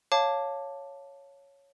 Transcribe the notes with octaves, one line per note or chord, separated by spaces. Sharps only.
C#5 F5 A5 D6